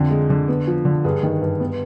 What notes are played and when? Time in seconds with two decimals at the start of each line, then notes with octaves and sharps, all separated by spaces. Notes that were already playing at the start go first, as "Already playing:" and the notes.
Already playing: F2 D3
0.11 G#3
0.30 D3
0.48 B3
0.67 F3
0.85 D3
1.04 G2 G#4
1.23 D#3
1.41 G2
1.60 B3